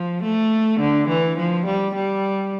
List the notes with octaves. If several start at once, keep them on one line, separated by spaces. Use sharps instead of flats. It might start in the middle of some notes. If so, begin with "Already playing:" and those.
Already playing: F3
A3
D3
E3
F3
G3
G3